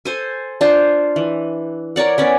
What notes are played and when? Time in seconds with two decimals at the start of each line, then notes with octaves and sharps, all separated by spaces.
0.05 A4 C5 G#5
0.61 D4 F4 C5
1.16 E3
1.96 A#4 C#5 D5 F#5
2.18 B3 C#4 D5